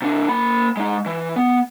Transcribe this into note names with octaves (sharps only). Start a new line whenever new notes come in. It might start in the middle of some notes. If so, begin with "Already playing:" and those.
C3 D4
A#3 B5
G#3 D#4
E3
B3